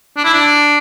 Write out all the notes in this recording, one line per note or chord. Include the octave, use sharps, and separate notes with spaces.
D4
E4
D4